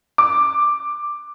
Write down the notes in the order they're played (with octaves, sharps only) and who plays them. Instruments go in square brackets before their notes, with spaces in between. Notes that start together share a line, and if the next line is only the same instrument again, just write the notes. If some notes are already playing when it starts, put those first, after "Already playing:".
[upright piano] D6